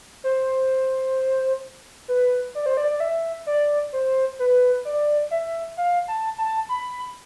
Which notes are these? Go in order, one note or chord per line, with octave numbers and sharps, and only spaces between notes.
C5
B4
D5
C5
D5
D5
E5
D5
C5
B4
D5
E5
F5
A5
A5
B5